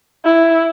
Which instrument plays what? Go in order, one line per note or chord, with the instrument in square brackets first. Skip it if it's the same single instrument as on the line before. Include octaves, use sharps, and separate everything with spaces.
[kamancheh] E4